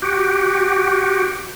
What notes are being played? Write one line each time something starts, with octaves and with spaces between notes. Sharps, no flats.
F#4 G4